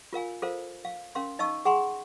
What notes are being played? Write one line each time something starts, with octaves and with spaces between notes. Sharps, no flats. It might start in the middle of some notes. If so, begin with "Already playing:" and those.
F4 A#4 F5 G#5
F4 A4 A#4 C5 F5
F5
C#4 A#4 F5 C6
D#4 D#5 F5 A5 C#6 E6
G#4 F#5 G#5 A#5 C6 C#6